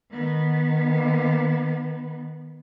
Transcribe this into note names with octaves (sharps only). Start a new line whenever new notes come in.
D#3 B3